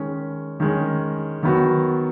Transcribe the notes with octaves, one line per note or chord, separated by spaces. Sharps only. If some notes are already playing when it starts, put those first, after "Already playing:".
Already playing: D#3 G#3 C#4
D#3 G#3 C#4
D#3 F#3 B3 F#4